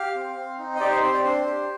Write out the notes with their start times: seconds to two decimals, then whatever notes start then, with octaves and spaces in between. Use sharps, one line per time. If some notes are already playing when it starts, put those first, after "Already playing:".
Already playing: G4 F5
0.16 C4
0.36 C4
0.59 D#4
0.75 D#5
0.80 G4 D5
0.91 C5
1.03 C4 C5
1.14 D5
1.24 D4 C5
1.46 G4